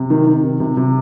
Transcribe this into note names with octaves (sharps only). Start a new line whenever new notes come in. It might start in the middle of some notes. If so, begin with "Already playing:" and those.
Already playing: C3
D#3
D#3
C3
C3
C3